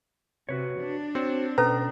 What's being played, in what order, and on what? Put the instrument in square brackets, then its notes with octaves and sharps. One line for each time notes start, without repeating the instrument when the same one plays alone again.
[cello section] C3 [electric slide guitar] F#4 B4 C#5
[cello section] D4
[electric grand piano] C4 [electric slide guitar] F#4 C5 C#5
[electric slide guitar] B2 [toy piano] C#4 A4 B4 [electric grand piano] A#5